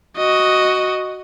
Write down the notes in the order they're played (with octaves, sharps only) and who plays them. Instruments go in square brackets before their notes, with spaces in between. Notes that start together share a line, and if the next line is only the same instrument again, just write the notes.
[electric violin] F#4 D#5